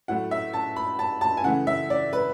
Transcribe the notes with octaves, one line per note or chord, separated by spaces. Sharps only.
A2 F#3 A3 F#5
E5
A5
B5
A5
A5
G#5
C#3 E3 A3 F#5
E5
D5
B4